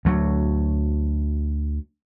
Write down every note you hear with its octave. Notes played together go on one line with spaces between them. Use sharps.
D2 F#3